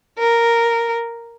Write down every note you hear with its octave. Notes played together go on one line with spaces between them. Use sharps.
A#4